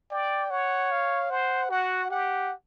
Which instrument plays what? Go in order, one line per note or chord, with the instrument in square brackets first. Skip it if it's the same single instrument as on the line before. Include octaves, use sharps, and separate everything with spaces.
[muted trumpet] D5 [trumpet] G5
[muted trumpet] C#5 [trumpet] F#5
[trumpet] F5
[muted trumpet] C5 [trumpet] F#5
[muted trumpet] F#4 [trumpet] F#5
[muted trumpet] G4 [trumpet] F#5